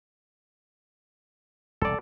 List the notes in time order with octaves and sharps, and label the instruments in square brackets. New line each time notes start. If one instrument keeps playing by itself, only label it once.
[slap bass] E1 C2 [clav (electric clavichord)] A4 D5